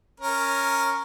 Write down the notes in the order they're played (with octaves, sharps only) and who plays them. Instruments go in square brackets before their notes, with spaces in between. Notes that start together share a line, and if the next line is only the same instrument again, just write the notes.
[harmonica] C#4 A#4